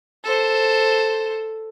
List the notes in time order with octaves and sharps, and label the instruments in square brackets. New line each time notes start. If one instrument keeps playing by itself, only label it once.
[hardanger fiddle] A4 C5